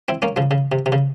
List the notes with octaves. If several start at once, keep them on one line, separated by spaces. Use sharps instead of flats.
C4 E4
A#3 C#4
C#3 F3
C#3
C3
C3
C#3